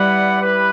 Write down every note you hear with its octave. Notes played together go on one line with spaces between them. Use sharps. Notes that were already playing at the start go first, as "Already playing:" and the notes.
Already playing: G3 E4 B4 D5 F#5
E4 G4 B4